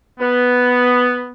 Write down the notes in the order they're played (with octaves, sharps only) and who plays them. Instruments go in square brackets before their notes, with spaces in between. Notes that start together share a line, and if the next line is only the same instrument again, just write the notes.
[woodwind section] B3